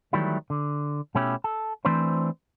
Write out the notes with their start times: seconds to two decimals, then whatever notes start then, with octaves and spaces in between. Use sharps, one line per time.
0.13 D#3 E3 F#3 G3 A3 E4
0.50 D3
1.15 B2 A3 C#4 E4 G4
1.44 A4
1.85 E3 A3 C4 D4 B4 C5